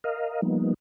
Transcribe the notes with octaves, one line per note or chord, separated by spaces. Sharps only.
A#4 D#5 F5
F3 G3 A#3 B3 D#4